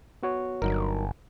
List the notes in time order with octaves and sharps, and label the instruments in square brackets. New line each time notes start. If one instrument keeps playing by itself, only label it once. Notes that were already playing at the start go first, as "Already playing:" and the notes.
[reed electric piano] B3 F#4 C#5
[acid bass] G1 [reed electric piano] F#3 D#4 A#4